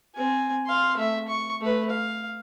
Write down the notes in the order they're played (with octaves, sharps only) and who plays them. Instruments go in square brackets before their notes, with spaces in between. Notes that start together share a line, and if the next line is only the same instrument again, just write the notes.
[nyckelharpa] C4 G#5
F5 C6
A3 E5
C#6
A3 B4
F5